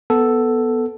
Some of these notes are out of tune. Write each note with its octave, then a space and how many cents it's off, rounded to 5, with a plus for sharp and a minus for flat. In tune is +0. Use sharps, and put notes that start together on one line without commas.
B3 +0 A4 +0